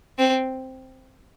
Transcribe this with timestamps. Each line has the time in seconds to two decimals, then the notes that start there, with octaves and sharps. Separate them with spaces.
0.18 C4